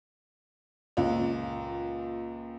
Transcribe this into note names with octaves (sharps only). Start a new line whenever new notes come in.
C#2 A#2